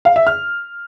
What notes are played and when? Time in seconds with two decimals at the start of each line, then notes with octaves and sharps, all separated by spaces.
0.05 F5
0.16 E5
0.27 F6